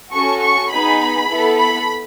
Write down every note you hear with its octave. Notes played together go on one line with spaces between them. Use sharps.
C#4 F#4 A4 C#6
C#6
B3 D#4 G#4 B5
B3 E4 A4
B5